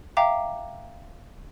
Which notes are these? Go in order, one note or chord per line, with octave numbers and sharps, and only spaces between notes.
E5 F5 G5 A#5 D6